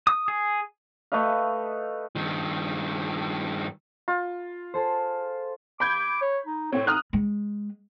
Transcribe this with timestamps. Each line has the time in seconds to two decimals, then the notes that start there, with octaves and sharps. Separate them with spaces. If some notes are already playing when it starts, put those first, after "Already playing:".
0.07 D#6
0.28 G#4
1.12 A3 B4 D#5 F5
2.16 G2 D#3
4.08 F4
4.74 G#4 A4 C5
5.80 B5 D6 G6 G#6
6.22 C#5
6.46 D#4
6.72 A2 C4 C#5
6.87 D#4 D#6 F6 F#6
7.13 G#3